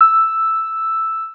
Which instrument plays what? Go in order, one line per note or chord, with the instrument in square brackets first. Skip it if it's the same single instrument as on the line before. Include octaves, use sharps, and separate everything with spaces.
[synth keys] E6